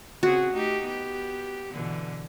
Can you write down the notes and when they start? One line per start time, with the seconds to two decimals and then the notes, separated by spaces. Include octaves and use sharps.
0.23 C#3 C4 F#4 G#4
0.51 A3 D#4 G4
0.84 B3 G4
1.72 B2 D3 E3